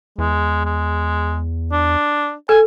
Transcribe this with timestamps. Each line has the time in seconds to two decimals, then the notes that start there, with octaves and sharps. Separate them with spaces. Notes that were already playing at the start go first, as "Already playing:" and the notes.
0.18 E2 G#3
0.66 G#3
1.72 D4
2.49 A4 G#5